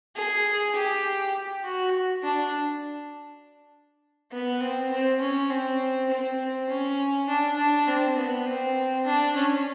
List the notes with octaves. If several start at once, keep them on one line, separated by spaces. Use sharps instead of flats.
G#4
G4
F#4
D4
B3
C4
C4
C#4
C4
C4
C#4
D4
D4
C4
B3
C4
D4
C#4